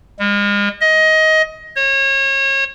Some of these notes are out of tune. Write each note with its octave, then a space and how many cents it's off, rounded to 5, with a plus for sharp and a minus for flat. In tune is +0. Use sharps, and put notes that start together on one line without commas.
G#3 -40
D#5 +20
C#5 -30